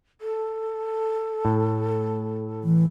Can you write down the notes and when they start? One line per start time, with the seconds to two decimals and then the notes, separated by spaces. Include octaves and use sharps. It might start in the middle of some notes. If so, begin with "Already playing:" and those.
0.21 A4
1.45 A2
2.64 E3